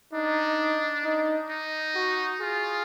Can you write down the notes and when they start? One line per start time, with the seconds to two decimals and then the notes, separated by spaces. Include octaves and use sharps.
0.13 D4 D#4
1.04 D#4
1.50 D#4
1.95 F#4
2.41 F4 G#4